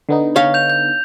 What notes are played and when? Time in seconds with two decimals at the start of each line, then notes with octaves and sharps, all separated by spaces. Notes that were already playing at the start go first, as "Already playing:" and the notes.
0.09 D3 B3 D#4
0.36 C#5 F5
0.54 G6 F7
0.70 G6